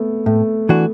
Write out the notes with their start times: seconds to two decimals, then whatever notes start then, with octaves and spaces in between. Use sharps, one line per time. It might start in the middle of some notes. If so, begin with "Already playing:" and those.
Already playing: A3 B3
0.26 A2 A3
0.69 E3 D4 F#4